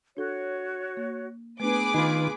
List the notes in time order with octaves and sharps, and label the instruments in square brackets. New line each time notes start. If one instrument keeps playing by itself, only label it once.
[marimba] D4 A4 [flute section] F#4 C#5
[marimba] A#3
[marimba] A3 B3 D4 [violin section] G#4 B4 D6
[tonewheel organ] D#3 D#4 [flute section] F4